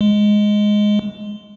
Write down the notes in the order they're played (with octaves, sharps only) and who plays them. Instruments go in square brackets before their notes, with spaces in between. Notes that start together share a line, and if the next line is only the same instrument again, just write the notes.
[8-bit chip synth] G#3